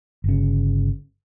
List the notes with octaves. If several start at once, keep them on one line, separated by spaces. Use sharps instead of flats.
G1 C#3